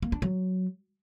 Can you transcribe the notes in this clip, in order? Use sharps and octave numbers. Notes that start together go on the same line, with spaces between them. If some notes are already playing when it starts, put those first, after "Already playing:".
A#3
D4
F#3